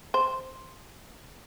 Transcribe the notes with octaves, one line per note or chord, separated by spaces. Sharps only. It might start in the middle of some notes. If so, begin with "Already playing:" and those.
C5